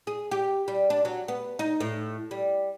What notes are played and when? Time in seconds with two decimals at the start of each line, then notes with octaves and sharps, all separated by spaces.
0.07 G#4
0.31 G4
0.68 G3
0.90 D4
1.05 F#3
1.28 B3
1.59 D#4
1.80 A2
2.31 G3